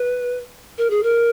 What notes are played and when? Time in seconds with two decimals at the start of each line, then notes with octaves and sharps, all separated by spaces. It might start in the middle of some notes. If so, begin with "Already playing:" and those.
Already playing: B4
0.78 A#4
0.90 G#4
1.03 A#4